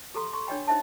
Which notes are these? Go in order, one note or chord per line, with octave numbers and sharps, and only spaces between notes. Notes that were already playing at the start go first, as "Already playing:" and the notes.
G4 A4 A#5 C6
C6 C#6
D4 C#5 D#5 G5 B5
D#4 C5 D#5 E5 A5